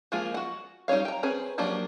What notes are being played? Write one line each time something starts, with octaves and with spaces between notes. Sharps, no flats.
F3 G#3 A#3 F4 G#4
F#4 F#5
G3 D#4 G#4 C#5 F5
G5 A#5
C4 C#4 G#4 B4
F3 F#3 A#3 D4 G4